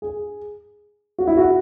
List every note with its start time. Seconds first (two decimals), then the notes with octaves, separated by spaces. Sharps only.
0.02 G#4
1.18 F#4
1.27 E4
1.37 F#4